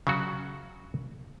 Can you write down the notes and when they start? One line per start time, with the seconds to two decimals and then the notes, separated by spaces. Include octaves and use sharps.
0.07 C#3 F#3 F#4